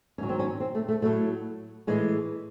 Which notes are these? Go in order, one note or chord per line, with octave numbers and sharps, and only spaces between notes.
G#2 D#3 F#3 C#4
C4
C#4
C4
A3
A3
A2 F#3 A3
A2 E3 G#3